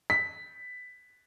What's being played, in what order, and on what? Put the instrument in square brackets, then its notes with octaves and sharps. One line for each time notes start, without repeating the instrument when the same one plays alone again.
[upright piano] B6